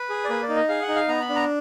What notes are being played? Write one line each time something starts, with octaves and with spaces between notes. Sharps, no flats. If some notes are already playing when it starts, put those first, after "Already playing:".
Already playing: B4
G#4
D5
A#3 B4
D5
D#4
D#5
G#4 F5
F#5
D#4
F5
B3 A#5
B5
D4
A#5